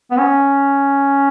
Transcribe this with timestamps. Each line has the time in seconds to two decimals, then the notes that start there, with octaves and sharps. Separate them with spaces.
0.11 B3
0.18 C#4